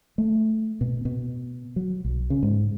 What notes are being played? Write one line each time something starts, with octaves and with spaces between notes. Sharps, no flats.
A3
B2
B2
F#3
B1
C#3
G#2